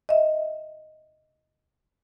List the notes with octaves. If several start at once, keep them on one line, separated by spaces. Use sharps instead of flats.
D#5 E5